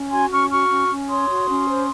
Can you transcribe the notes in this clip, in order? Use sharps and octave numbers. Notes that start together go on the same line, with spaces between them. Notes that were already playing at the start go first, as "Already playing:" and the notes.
Already playing: C#4
F#4 G#5 C6
C#4 C#6 F6
F#4 C#6 F6
C#4
C#4
C#5 C6 D#6
F#4
C#4
C5